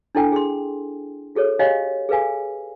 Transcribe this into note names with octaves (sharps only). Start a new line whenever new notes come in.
D4 E4 A4 G5 G#5
G#4 C6
F#4 G#4 A4 C#5
G4 C#5 D#5 F5 G#5
G#4 A4 B4 F5 G#5